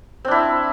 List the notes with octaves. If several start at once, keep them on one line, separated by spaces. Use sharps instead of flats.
C4 D4 E4